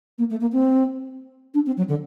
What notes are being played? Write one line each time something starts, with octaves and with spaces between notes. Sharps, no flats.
A#3
A3
A#3
C4
D4
C4
F#3
D3